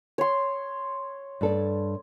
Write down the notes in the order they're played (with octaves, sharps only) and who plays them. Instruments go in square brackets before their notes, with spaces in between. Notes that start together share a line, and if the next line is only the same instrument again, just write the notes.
[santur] C#5 C6
[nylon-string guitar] G2 A4 D5